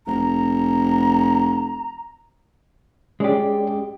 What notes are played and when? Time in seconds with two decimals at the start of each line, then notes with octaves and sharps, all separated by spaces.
0.07 F1 A#5
3.20 G#3 C#4 G4 G#4 D5